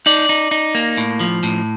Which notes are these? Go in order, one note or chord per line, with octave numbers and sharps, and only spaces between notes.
D#4 D5
D#4
D#4
A#3
A2
F3
A2